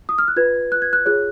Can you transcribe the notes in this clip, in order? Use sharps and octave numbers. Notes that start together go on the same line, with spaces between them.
D#6
F6
F#6
F4 B4 G#6
F#6
G#6
F#6
F4 G#4 C#5 F#6